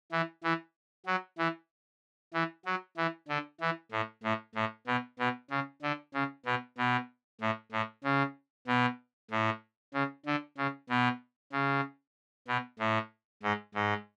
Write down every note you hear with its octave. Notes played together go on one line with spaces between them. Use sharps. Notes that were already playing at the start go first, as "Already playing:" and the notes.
E3
E3
F#3
E3
E3
F#3
E3
D3
E3
A2
A2
A2
B2
B2
C#3
D3
C#3
B2
B2
A2
A2
C#3
B2
A2
C#3
D3
C#3
B2
C#3
B2
A2
G#2
G#2